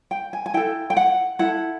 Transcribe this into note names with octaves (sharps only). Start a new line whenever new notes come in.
G5
G#5
G#5
E4 A4 G5
G5
F#5
E4 A4 F#5